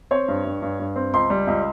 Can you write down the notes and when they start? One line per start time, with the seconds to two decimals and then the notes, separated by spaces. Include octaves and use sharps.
0.11 C4 C#5
0.28 G2
0.45 G2
0.62 G2
0.79 G2
0.96 C4
1.13 C#2 C6
1.30 G3
1.47 C#2